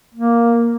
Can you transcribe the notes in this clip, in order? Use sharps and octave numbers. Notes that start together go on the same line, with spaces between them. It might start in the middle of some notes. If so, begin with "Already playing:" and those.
A#3